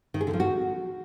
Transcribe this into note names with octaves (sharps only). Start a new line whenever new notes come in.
D#3
G#4
D3
F3
F#4